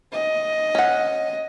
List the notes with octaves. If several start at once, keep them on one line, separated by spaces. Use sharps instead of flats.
D#5
C#4 F#5